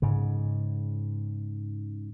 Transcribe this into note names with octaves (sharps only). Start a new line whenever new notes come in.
G#2 C#3